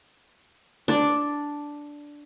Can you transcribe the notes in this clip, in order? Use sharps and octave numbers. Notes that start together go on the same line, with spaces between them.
D4 D5